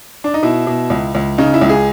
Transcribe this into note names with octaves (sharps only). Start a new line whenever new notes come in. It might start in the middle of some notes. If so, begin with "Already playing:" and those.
D4
D#4
B2 E4
B2
C#2
C#2
C#3 D#4
E4
C#2
G#4